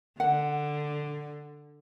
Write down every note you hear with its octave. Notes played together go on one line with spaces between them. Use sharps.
D3 F#5